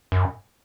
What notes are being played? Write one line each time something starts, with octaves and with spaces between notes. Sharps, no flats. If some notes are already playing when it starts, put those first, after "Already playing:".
F#2